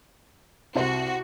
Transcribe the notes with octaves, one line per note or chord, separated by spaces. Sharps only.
C2 C3 F#4 C5